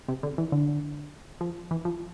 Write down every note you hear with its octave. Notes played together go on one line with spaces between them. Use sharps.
C3
D3
E3
D3
F3
E3
F3